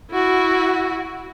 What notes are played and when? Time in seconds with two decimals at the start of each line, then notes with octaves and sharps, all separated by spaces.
0.11 E4 F#4